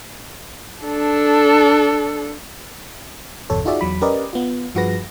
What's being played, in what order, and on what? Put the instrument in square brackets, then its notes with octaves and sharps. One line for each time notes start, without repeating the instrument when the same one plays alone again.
[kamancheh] D4 A4
[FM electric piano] G1 E2 B2 A4 C#5
D#4 F4 F#4 G#4 D5 E5
E2 F#3 B5
C#4 G4 A#4 B4 D5 D#5
B3 F4
G2 F3 F#4 G#4 B4 A#6